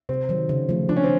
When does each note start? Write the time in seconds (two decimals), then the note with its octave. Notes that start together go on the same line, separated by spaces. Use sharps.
0.09 C3 C4
0.29 D#3 F#3
0.49 C#3
0.69 F3 A3
0.89 F3 D4
0.96 C#4
1.04 C4